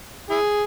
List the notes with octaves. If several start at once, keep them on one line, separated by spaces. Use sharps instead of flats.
E4 G#4